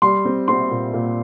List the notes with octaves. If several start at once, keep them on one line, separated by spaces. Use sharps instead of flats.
G3 C6
C4
C4 C6
A#2
A#2